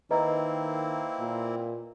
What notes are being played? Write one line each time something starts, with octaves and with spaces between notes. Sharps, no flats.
D#3 A#3 C4 E4 B4 D#5 A#5
A#2